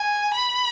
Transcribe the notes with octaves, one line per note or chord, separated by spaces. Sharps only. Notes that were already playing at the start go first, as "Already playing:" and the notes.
Already playing: G#5
B5